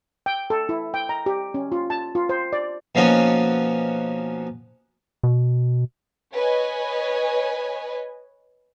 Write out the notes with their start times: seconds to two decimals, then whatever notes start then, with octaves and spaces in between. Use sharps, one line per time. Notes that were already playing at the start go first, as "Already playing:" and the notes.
0.26 G5
0.50 A4
0.69 E4
0.94 G5
1.09 A#5
1.26 G4
1.54 C#4
1.72 F4
1.90 A5
2.15 F4
2.29 C5
2.53 D5
2.95 B2 F3 A#3 C#4 D#4 F#4
5.23 B2
6.34 B4 C#5 D#5 G#5